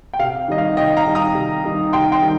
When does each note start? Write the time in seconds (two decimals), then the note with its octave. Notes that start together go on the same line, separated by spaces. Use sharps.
0.14 G5
0.19 C3 F5
0.48 D#3 G3 D#4 D#5
0.58 F5
0.77 C3 D#5 G5
0.97 F5 A#5
1.06 D#3 G3 D#4
1.15 A#5 D#6
1.35 C3
1.64 D#3 G3 D#4
1.93 C3 G5 C6
2.12 G5 C6
2.22 D#3 G3 D#4